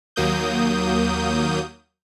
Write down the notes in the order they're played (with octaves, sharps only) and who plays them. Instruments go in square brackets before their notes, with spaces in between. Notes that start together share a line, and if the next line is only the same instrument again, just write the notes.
[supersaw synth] D#2 F#3 A#3 D#6 G6